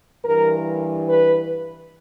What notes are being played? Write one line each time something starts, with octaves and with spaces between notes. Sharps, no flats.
G2 E3 A#4
B4